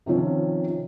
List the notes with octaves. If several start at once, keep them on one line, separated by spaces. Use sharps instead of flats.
C3 D#3 F3 C#4